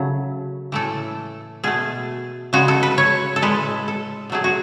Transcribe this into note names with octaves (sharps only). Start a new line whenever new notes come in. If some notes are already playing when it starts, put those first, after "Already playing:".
Already playing: C#3 F#3 A3
A2 E3 A3 A4
B2 A3 G#4
C#3 G#3 F#4
A4
B4
C#5
A4
A2 G#3 B4
A4
B2 F#3 A3 G#4
F#4